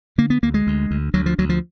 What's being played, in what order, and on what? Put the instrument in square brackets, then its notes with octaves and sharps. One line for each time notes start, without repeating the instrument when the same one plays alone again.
[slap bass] D3 A#3
B3
D2 A#3
G#3
D2
D2
D2 F#3
F3
D2 F#3
F3